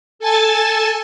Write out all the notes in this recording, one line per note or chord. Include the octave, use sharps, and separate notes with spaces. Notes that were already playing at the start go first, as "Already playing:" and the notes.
A4 G#5 A5 A6